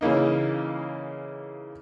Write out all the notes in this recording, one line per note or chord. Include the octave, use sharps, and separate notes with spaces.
C#3 E3 A#3 D#4